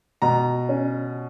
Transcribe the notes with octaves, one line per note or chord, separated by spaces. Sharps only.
B2 A#5
C#4